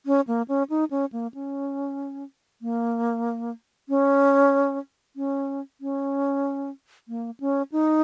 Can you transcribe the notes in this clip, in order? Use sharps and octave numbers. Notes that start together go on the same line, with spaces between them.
C#4
A#3
C#4
D#4
C#4
A#3
C#4
A#3
C#4
C#4
C#4
A#3
C#4
D#4